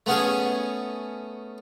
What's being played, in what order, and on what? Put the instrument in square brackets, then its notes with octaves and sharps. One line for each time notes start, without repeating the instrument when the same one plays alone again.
[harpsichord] A3 B3 C#4 G#4